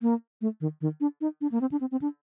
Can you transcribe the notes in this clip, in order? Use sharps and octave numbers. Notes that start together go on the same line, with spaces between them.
A#3
A3
D#3
D#3
D4
D#4
D4
A#3
C4
D4
C4
C4
D4